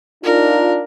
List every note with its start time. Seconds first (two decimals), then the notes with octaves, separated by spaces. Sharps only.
0.24 D4 D#4 F4 A#4